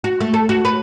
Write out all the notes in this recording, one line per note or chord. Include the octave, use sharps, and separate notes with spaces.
F#4
A3
A4
F#4
B4